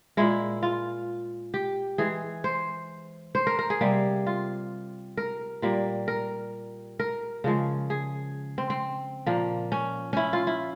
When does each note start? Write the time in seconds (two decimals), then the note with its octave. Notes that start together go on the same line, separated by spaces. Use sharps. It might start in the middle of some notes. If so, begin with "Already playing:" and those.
0.17 A#2 G#3 E4
0.63 F4
1.54 G4
1.98 E3 G#3 G#4
2.44 C5
3.35 C5
3.47 A#4
3.59 A#4
3.70 G#4
3.81 C3 G3 A#3
4.27 F4
5.17 A#4
5.62 A#2 G3 A#3
6.08 A#4
6.99 A#4
7.44 C#3 F3 G#3
7.90 G#4
8.58 C4
8.70 C4
9.26 A#2 F3 A#3
9.72 C#4
10.13 C#4 E4
10.33 F4
10.47 E4